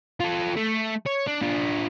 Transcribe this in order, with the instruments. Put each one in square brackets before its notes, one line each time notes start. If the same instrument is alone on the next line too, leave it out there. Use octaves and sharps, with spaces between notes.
[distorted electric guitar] F4 A4
A3
C#5
D4
D4 F4